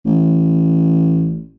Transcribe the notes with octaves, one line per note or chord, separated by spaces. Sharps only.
A1